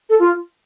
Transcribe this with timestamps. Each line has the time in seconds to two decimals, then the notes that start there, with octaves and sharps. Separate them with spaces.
0.09 A4
0.19 F4